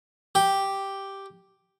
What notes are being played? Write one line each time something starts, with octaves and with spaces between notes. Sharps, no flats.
G4